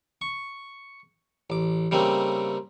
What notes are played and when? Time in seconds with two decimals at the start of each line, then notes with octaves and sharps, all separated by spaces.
0.21 C#6
1.50 A1 D6
1.91 C#3 G3 A3 A#3 C4